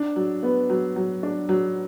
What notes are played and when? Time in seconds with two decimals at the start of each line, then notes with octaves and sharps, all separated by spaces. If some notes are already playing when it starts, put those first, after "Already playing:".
Already playing: D4
0.16 F#3
0.43 B3
0.70 F#3
0.96 F#3
1.23 D4
1.49 F#3